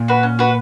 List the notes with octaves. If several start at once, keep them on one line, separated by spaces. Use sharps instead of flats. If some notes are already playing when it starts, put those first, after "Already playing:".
Already playing: A#2
F#4 B4
C#4
F#4 B4